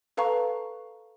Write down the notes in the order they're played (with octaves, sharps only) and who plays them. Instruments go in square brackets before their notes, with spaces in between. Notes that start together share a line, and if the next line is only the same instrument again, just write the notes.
[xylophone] A4 B4 F5 A5 A#5 C#6